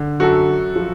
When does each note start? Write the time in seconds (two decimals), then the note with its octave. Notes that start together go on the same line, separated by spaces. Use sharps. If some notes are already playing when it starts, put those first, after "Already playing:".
Already playing: D3
0.20 F#2 F#4 A4
0.48 F#2
0.76 F3